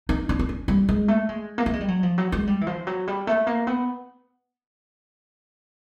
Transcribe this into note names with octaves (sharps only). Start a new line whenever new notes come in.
D#4
D4
D4
C#4
G3
G#3
A3
G#3
A#3
A3
G#3
G3
F#3
F3
F#3
G#3
G3
E3
F3
F#3
G3
A3
A#3
B3